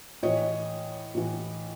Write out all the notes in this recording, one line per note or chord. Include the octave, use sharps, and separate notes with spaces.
A2 E3 C#5 D#5
A2 E3